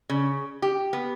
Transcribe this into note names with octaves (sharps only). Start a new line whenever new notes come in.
C#3
G4
B3